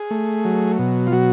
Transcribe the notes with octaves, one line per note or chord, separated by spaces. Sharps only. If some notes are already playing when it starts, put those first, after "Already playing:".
Already playing: G#4
A3
F#3
B2
F4
F#3 F#4